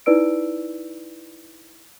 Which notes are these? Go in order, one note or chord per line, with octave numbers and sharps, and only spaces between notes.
D#4 E4 B4 D5 E6 D7